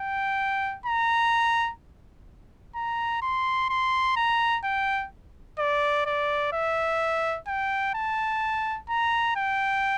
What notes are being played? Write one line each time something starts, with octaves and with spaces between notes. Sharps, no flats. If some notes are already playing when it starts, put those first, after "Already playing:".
Already playing: G5
A#5
A#5
C6
C6
A#5
G5
D5
D5
E5
G5
A5
A#5
G5